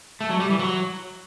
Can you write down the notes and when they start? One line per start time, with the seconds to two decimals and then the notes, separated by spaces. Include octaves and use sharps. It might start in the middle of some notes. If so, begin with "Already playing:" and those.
0.21 A3
0.30 F#3
0.40 G3
0.50 E3
0.59 F#3